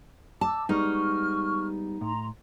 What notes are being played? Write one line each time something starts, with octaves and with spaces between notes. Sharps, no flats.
A5 D6 E6
G3 G#3 B3 D#4 C#6 F6
A2 A#5 C6